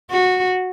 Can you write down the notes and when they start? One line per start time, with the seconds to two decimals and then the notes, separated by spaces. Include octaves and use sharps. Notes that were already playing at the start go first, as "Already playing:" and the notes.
0.10 F#4